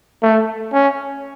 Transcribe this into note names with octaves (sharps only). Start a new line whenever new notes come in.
A3
C#4